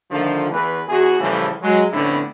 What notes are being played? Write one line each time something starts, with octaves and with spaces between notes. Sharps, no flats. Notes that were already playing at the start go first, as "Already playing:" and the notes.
D3 D#3 F3 A3 F4
E2 B4
E2 F#4 G#4
A2 C#3 E3 F3 G3 A3
F#3 G#3
F2 A2 D3 B3 C#4 E4